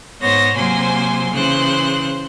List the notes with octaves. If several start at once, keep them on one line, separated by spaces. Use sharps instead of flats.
G#2 B3 C5 C#5 A#6
C3 F#3 A#3 C5 G#5 C6
C#3 E3 C5 F#6